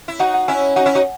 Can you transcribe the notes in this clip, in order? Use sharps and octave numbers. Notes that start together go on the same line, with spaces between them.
E4
D#4 F#4 F#5
F#5
C#4 E4 G#5
D#4 F#4 F#5
C#4 E4
D#4 F#4